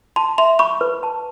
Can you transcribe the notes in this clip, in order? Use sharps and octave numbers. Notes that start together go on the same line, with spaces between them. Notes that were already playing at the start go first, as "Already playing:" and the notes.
A5 C6
E5 C6
B5 C#6
B4
A5